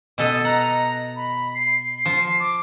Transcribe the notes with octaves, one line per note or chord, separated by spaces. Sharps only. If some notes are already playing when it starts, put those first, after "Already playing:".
B2 A4 D#5
F#5 A#5
B5
C7
F3
D6